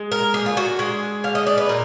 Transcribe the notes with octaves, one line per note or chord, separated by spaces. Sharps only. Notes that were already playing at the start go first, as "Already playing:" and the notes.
Already playing: G#3
A#4
D3 G#4
F4
F#4
G#3 G#4
D3 F5
D#5
D5
B4
A#2 A#4